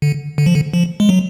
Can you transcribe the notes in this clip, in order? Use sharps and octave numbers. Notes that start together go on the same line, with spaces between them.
D3
D3
F3
D3
F3
G#3
F#3